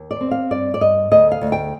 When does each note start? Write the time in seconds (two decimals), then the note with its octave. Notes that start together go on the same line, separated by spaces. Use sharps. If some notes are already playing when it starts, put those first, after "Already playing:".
Already playing: D#2
0.11 D5
0.21 C4
0.31 F5
0.51 G2 D5
0.74 D5
0.81 G2 D#5
1.11 D2 D#5
1.32 F5
1.41 D2
1.52 G5